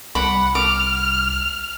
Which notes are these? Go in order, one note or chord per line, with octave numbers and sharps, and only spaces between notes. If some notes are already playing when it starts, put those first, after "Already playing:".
C2 F#5 B5 D6
D6 F6